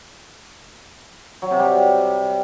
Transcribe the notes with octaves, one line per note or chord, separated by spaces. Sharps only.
F#3
C3
G3